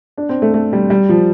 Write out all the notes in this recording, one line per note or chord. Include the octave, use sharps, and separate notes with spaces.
D4
C4
A3
A3
G3
G3
F3